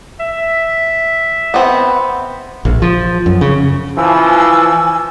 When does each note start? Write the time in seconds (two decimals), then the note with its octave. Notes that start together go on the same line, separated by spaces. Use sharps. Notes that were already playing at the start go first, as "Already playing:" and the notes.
0.20 E5
1.54 B3 C4
2.65 A#1
2.82 F3
3.26 F#2
3.41 C#3
3.97 E3 F3 G#5 E6